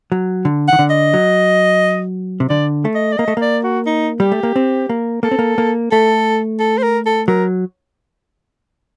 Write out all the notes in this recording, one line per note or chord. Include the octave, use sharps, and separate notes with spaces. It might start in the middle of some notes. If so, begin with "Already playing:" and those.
F#3
D3
D#3 F#5
D3
D#5
F#3
C3
D3 D5
A3
D#5
D5
A#3 D#5
A3
A#3 D5
F#4
D#4
G3 G4
A3
A#3
C4
A#3
A#3 A4
C4
A#3
A#3
A3 A4
A4
C5
A#4
A4
F#3 A#4